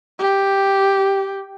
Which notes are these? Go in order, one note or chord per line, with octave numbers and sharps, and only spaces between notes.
G4